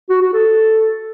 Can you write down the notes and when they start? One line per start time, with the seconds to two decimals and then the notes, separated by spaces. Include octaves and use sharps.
0.10 F#4
0.21 F#4
0.33 A4